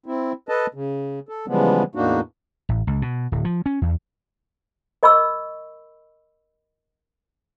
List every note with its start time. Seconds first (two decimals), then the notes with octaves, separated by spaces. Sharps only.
0.06 C4 E4
0.49 A4 B4 D#5 A5
0.74 C#3
1.29 A4
1.48 C#3 E3 F3 G3 G#3 B3
1.95 E2 A2 A#3 D4 D#4 F#4
2.69 A1
2.87 C#2
3.02 B2
3.32 D1
3.45 F3
3.66 C#4
3.82 E2
5.03 A#4 D#5 B5 C#6 E6